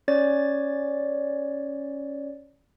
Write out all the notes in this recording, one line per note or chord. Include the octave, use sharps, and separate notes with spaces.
C#4 C#5 D5 A6